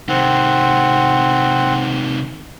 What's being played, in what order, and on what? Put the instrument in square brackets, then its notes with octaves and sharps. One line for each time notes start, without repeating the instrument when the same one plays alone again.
[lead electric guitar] C3 D#3 [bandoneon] C4 F#5